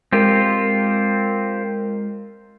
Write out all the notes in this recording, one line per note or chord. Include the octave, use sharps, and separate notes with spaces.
G#3 C4 F4 G4 A#4